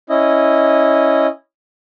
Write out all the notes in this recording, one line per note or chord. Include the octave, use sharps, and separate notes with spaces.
C#4 E4 D#5